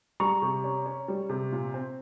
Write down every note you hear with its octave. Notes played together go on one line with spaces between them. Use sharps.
G3 A#5 C#6
C3
C#4
C#4
G3
C3
A#2
C4